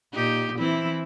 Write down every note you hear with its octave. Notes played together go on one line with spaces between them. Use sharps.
A#2 D#4 G4
E3 C4 E4